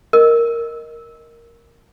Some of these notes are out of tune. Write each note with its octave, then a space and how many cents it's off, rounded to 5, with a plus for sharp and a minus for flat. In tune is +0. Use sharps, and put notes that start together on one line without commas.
A#4 +0 D#5 +0